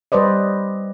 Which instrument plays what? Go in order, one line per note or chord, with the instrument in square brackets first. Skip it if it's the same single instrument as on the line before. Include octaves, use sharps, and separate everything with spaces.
[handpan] G3 B4 C5 D5 D#5